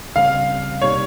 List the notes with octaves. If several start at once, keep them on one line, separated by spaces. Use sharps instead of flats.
C#2 C#3 G3 C4 F5
C3 G3 A#3 D#4 C#5